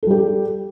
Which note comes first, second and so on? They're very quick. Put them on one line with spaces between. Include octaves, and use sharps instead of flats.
A4 G3 G4